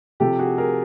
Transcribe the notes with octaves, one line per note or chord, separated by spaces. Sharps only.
C3 F3 G4 A4
F#4 G#4
G#4 A#4